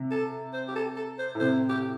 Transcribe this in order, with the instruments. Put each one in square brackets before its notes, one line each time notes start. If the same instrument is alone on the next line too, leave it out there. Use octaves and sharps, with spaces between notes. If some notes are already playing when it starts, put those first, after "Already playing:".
Already playing: [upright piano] C3
[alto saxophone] A4
C5
G4
A4
A4
C5
[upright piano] A2
[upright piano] C3 [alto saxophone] C5
[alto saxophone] G4